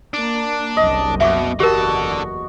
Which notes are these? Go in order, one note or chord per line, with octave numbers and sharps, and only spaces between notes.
A#3 D4
F#1 C2 F#2 D#5
B2 E5 C#6 D6
F#1 E2 D3 F#4 G4 A#4 A5